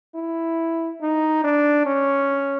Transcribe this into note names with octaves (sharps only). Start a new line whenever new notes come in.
E4
D#4
D4
C#4